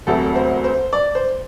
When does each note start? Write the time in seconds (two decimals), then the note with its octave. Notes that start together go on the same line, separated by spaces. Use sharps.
0.07 E1 D2 C3 F#3 A3 A4
0.36 C5
0.64 C5
0.93 D5
1.15 C5